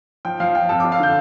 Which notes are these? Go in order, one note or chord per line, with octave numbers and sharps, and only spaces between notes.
F3 G5
F3 F5
F3 G5
F2 A5
F2 D6
F5
D3 G6